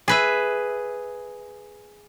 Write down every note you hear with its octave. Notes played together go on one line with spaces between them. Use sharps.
G#4 B4 E5